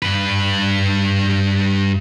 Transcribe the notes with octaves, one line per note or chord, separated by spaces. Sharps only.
G2 B4